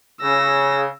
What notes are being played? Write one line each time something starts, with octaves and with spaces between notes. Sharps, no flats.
C#3 E6 A#6